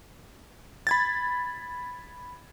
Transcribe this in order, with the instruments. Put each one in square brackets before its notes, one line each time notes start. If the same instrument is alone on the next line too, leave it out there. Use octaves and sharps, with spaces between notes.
[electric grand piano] B5 G#6 A6